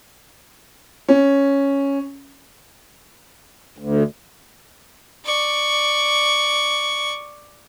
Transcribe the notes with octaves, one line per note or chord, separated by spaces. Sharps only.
C#4
D2
D5 C#6